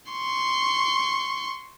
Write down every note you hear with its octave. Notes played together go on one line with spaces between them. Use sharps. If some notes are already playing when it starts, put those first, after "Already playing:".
C6 C#6